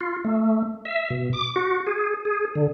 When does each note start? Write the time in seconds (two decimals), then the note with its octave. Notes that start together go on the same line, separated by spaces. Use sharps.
0.01 F4
0.24 A3
0.85 E5
1.10 B2
1.33 D6
1.56 F#4
1.87 G#4
2.25 G#4
2.55 D3